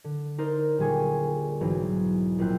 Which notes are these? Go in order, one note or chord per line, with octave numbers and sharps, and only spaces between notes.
D3
D#4 A#4 C5 D5
D#1 D3 G3 G#4 G#5 C#6
B1 G#2 E3 F#3
A#1 C4 E4 F#6 G6